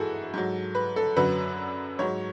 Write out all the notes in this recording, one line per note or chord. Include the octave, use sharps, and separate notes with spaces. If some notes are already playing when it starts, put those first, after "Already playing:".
Already playing: G#2 E3 E4 F#4 G#4 A4
G#2 F#3
B4
A4
F#2 D3 F#3 B4
G#2 F#3 C#5